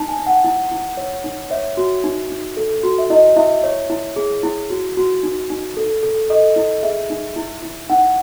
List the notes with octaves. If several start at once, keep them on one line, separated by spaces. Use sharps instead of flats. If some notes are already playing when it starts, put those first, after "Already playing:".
Already playing: D#4 A5
G#5
D#4
F#5
E4
E4
C#5
D#4
C#5 E5
F#4
D#4
D#4
A4
F#4
E5
E4 D#5
E4 E5
C#5
E4
G#4
E4
F#4
F#4
D#4
D#4
A4
A4
A4 D#5
E4
G#4 E5
D#4
E4
E4
D#4 F#5